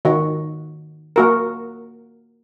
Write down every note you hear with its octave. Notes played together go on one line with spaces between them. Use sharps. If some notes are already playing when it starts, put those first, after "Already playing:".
D#3 F#4
A#3 F#4 A#4